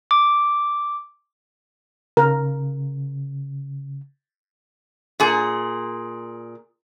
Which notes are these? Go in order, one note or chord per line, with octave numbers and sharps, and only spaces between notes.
D6
C#3 A#4
A#2 G#4